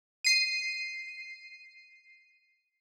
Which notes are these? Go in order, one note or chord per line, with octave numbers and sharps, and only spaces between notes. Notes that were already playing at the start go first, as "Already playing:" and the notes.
C7 D#7